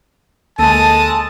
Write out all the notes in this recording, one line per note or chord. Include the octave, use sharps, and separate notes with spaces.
D2 G#3 A#3 A4 A5 D#6 A6